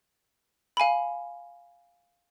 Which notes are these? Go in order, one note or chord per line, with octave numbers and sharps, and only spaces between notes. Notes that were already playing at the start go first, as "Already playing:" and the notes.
F5 G#5 B5